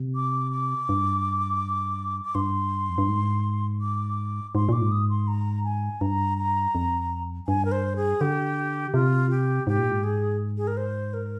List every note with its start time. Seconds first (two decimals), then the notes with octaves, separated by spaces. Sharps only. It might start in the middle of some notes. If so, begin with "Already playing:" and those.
Already playing: C3
0.15 D6
0.52 D6
0.89 G2
2.24 D6
2.35 G2 C6
2.89 F2
2.98 G2
3.08 G#2
3.81 D6
4.55 G#2 C6
4.69 A#2 D6
4.82 G#2
4.92 D#6
5.10 C6
5.28 A#5
5.64 G#5
6.01 G2 A#5
6.38 A#5
6.75 F2
7.47 G2 G#5
7.65 A#4
7.72 C5
7.96 G#4
8.21 D3 G4
8.94 C3 F4
9.31 G4
9.67 G#2 G4
9.79 A#2
9.91 G#2
10.03 G#4
10.57 G#4
10.67 A#4
10.77 C5
11.14 A#4